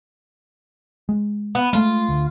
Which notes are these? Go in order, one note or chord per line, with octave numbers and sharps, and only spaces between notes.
G#3
B3
G#3 A3 F4
D2